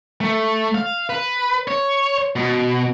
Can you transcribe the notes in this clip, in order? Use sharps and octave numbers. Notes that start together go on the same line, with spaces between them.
A3
F5
B4
C#5
B2